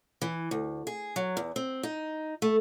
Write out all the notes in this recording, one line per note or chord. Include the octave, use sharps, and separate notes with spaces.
E3
D2
G#4
F#3
E2
C4
D#4
A3